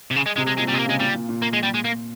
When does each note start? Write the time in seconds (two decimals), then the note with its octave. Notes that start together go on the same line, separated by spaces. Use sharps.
0.11 C3
0.16 C#3
0.26 G#3
0.36 C3 G#3
0.47 G#3
0.58 A#2 G#3
0.69 G3
0.72 C3 G#3
0.79 A#3
0.85 C#3 G#3
1.00 A#2 G3
1.14 A#2
1.29 A#2
1.42 A#3
1.53 G#3
1.63 G3
1.74 G#3
1.84 A#3